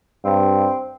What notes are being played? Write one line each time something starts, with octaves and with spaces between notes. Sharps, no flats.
G2 C4